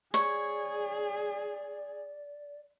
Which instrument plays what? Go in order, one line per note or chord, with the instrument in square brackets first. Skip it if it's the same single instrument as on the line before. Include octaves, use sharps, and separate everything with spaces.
[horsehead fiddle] G#4 [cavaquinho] C#5 [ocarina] D5